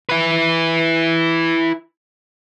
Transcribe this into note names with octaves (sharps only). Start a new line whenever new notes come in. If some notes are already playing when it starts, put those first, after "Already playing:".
E4 B4